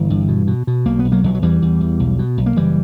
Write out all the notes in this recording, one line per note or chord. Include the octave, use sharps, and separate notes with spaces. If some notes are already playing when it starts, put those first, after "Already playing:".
Already playing: G1 E3
G2
B2
B2
B2
B1 A#3
B3
B1
F#3 A#3
B1 E3
F#3
E2 E3 G3
E2
E2
B1
B2
B1
A#3
F#1 E3 G3